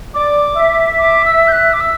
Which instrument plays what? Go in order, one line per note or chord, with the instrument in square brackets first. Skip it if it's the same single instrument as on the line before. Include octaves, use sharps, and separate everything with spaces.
[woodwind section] D5 [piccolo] D6
[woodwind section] E5
[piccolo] D6
E6
G6
F#6
D6
E6